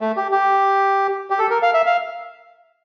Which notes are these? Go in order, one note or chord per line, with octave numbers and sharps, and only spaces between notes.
A3
G4
G4
G4
A4
A#4
F5
E5
F5